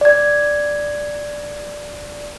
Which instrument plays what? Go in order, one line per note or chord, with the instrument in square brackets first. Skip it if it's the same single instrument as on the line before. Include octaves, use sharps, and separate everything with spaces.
[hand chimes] D5 G#6